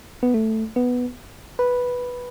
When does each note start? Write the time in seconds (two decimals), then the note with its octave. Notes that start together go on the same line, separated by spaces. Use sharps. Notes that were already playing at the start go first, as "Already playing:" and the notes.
0.23 B3
0.34 A3
0.76 B3
1.59 B4